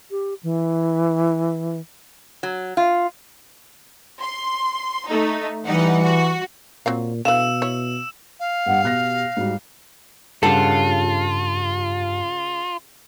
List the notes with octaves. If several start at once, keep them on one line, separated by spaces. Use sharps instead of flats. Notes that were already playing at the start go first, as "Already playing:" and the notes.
G4
E3
F#3
F4
C6
A3 D#4
E3 G3 D#4 F#5
F#4
A#2 F#3 C4 F5
B2 D3 E3 F5 E6 E7
E4 C#5
F5
G2 G3 F#5
B2 G4 F#6 A#6
G#2 G3 F#4
G2 C#3 F4 G4 A4 F#5 C7